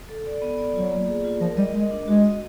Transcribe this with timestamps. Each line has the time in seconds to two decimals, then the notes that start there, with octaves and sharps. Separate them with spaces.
0.09 A4
0.26 D5
0.42 B3
0.58 D5
0.75 F#3 F4
0.91 A#3
1.08 G#4
1.24 F4
1.41 F3 A#4
1.57 G3 D#5
1.74 G#3 D#5
1.91 D4
2.07 G#3 F#4
2.24 D#5